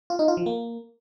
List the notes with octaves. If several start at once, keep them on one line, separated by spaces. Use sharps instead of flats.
F4
D#4
F4
F3
A#3